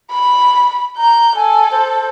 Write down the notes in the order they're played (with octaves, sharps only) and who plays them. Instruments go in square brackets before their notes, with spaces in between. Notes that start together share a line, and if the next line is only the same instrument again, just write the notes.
[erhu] B5
[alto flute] A#5 [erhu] G6
[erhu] A4 [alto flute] G#5
[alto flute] C5